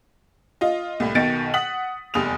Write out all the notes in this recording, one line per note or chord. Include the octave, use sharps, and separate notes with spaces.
F4 D#5
C2 A2
B1 B2 D#3 A6 C#7 D7
F#5 D#6 B6 F#7
F1 E2 G3 D#6 F7